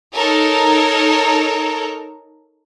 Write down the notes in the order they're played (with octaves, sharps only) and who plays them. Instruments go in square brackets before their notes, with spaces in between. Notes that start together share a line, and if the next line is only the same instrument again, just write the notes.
[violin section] D#4 A4 A#4 C#5